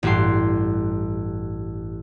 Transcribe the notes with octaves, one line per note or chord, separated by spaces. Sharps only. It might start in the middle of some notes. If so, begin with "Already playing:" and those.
A1 G2 F#4 G4 C6